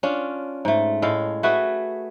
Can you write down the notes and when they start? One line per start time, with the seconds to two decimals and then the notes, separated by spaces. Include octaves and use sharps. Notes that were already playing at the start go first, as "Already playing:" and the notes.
0.03 C#4 D4 F4
0.65 G#2 A3
1.02 A2 G#3 A4 F5
1.43 A3 F#4 G#4 B4